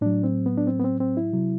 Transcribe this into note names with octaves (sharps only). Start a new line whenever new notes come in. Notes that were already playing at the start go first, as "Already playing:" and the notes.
A2 F#3 D4
C4
B3
D4
C4
B3
C4
C4
E4
C3 F#3